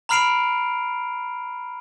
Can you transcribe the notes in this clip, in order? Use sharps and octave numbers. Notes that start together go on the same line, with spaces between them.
A#5 B5 F6 C7 D7 F7